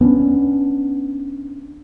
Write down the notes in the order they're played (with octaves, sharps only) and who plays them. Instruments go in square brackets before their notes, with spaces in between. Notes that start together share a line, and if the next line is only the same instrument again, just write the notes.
[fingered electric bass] B3 C#4 D4